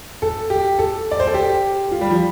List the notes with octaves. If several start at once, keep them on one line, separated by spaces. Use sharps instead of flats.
A4
G4
A4
D5
C5
A4
G4
F4
G3
F3